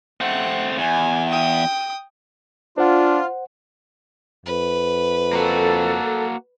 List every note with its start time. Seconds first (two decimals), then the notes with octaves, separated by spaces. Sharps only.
0.21 A3 C4 F#5
0.78 E2 G#5
1.29 G5 D#6
2.78 D4 F4 C5 F#5
4.46 F2 B4
5.33 A#3 F#4 A4